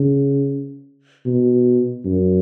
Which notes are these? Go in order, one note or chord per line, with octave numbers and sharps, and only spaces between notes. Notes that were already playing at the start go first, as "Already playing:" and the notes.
Already playing: C#3
B2
F#2